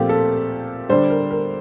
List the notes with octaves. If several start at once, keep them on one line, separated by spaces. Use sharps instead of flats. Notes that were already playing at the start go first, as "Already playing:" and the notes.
Already playing: A#2 F3 A3 C4 F4 G4
A4
D3 G3 D4 C5
A#4
A#4